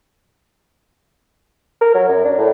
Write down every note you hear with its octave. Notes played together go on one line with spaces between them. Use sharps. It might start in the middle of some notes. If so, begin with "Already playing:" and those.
A#4
F#3
F#2
D4
A2